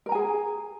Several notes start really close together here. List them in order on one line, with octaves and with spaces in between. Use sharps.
A#4 A#5 G#5 G#4